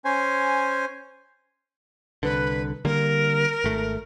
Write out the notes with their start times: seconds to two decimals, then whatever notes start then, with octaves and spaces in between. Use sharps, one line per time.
0.05 C#4 C5 G#5
2.23 C2 D3 B4
2.85 D3 G3 A#3 A#4
3.64 G#1 A3